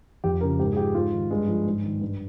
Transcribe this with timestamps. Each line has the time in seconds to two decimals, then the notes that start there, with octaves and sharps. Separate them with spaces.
0.24 F2 G4
0.41 C#3 F3 A#4
0.59 G#2 G4
0.73 G#4
0.77 F3 G4
0.95 G#2 F4
1.13 D#3
1.30 G2 G#3
1.48 F3
1.66 G#2
1.84 D#3
2.01 G2